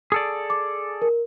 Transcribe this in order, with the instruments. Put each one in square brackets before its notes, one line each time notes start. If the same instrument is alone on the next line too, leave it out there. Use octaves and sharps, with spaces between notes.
[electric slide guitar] G#4 A4 D5
[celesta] D6
A#4